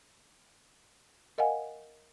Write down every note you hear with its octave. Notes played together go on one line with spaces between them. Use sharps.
A#4 D#5 F5 F#5 G#5